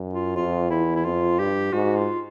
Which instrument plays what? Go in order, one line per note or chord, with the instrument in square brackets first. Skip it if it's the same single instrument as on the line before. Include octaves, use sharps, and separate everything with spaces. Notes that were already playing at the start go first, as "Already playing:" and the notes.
Already playing: [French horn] F#2
[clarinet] F4
[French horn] F2 [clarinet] F4
[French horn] E2 [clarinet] E4
[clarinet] E4
[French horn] F2 [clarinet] F4
[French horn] G2 [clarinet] G4
[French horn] G#2 [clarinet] F#4
[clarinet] F4